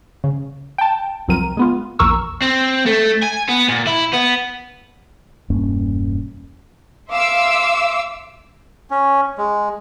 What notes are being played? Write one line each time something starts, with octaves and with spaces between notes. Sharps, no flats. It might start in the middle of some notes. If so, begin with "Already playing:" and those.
C#3
G5 A5
C2 F2 F#3 C4 A#4 D#7
G#3 B3 F4
A#1 E2 A#4 C#6 E6
C4
A3
G#5
B3
A#2
E4
B3
E1 G2 A#3 C#4
E5 F5 C6 D6 E6
C#4
G#3